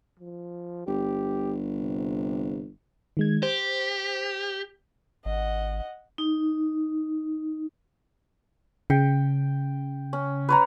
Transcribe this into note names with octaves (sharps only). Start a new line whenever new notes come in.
F3
G1 G4
C3
D#3 G#3 G#6
G4 C5
G#1 D#5 F#5
D#4
C#3 G5
C#4
B4 C#5 A#5